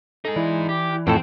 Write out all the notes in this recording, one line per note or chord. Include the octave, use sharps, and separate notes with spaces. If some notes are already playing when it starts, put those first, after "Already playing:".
D#4 G#4 A4
E3 E4 D5
G4
F2 A2 C4 A4